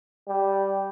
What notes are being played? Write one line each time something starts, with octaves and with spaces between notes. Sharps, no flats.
G3